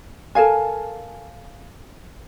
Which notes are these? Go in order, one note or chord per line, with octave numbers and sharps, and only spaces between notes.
A4 A#4 F5 G#5